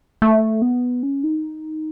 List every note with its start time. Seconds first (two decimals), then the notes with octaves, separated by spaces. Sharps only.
0.22 A3
0.62 B3
1.03 C#4
1.23 D#4